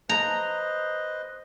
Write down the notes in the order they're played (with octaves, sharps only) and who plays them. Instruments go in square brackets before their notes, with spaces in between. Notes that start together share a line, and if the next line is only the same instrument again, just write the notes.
[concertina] B4 C5 D#5 [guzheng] A#5